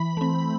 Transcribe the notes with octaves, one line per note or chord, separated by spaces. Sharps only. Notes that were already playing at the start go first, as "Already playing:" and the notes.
Already playing: E3 B5
A3 C4